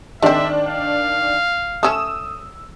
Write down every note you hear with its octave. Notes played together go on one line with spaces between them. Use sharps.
D#3 G#3 C4 D4 E5
F5
A3 C#4 D#6 E6 E7